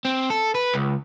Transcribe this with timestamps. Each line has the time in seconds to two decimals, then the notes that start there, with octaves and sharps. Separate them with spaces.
0.05 C4
0.30 A4
0.55 B4
0.74 C#2